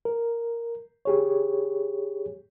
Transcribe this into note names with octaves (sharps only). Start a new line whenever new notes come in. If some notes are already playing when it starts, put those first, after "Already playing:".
A#4
G4 G#4 C#5